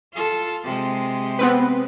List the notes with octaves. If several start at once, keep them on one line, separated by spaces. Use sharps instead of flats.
F4 A4
C3 G#3
B3 C4 B4